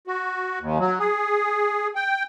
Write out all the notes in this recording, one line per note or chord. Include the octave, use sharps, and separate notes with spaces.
F#4
D#2
F#3
G#4
G5